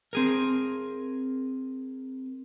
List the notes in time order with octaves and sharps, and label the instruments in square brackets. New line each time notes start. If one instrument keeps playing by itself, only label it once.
[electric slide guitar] C4 G#4 A#4